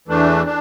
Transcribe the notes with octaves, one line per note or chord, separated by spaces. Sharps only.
E2 E3 A3 D4
D4